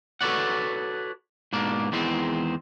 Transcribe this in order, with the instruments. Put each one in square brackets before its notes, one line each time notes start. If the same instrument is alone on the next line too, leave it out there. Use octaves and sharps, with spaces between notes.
[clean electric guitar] F#4 A4 B4 C#5 D5 F#5
G#2 B2 A#3 D4
E2 D#3 E3 G#3 C4